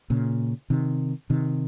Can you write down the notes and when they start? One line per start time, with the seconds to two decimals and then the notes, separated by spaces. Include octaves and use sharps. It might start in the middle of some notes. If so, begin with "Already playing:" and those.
0.10 A#2 C#3
0.70 C3 D#3
1.30 C3 D#3